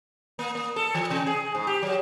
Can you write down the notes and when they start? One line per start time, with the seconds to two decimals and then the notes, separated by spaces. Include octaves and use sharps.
0.39 A#3
0.55 A#3
0.76 A4
0.95 E3
1.10 C3
1.27 G#4
1.55 G#2
1.67 G4
1.83 F#3